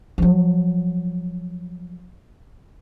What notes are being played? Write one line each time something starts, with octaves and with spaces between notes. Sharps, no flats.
F3 F#3